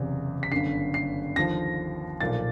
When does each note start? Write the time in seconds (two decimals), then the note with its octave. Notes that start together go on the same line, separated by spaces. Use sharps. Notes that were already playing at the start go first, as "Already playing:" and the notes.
Already playing: F#1 E2 C3
0.43 B6
0.52 G1 F#2 D3 C7
0.94 C7
1.36 D#2 D3 F3 A#6
2.21 B1 A#2 F3 A6